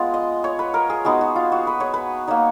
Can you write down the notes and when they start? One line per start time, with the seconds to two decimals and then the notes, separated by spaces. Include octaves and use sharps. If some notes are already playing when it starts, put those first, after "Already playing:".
Already playing: G#3 B3 F4
0.14 D#5
0.44 C#5
0.59 B4
0.74 A#4
0.90 G#4
1.05 G#3 B3 D#4 F#4
1.21 F#4
1.36 F4
1.52 F#4
1.67 B4
1.80 C#5
1.94 B4
2.27 A#3 D#4 C#5